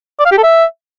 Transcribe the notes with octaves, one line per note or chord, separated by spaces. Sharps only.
D5
F5
G4
A4
E5